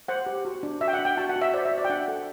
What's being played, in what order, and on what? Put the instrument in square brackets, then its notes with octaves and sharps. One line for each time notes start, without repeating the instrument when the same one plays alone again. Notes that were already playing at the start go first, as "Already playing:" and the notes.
[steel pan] C5 F#5
G4
F#4
D4
F#4 E5
G5
F#5
D4
G5
F#4 A5
F#5
F#4
E5
C5 D5
E5
F#4
D5
G5
D4 F#5
A4